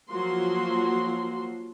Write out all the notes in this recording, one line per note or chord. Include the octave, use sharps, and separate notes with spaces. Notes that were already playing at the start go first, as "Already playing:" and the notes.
F3 F#3 A#3 F#4 C6